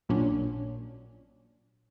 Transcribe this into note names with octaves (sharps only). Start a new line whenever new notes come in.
A#1 A#2 F#3 C#4 D4